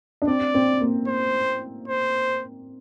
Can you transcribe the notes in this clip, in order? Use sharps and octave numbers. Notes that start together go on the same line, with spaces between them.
D4
C4 D5
C4
A#3
C5
C5